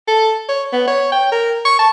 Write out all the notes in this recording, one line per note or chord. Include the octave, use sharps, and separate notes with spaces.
A4
C#5
B3
C#5
G5
A#4
C#6
A5